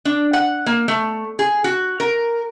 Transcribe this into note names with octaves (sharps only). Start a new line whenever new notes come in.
D4
F#5
A#3
A3
G#4
F#4
A#4